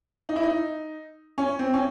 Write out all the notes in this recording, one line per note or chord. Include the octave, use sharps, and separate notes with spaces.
D#4
E4
D#4
C#4
C4
C#4